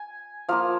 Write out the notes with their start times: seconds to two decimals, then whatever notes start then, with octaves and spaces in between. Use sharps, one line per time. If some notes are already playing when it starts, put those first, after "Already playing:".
Already playing: G#5
0.49 F3 A#3 F4 F5